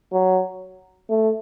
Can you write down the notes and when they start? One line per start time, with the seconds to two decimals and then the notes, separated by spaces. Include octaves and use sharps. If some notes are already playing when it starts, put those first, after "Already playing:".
0.13 F#3
1.10 A3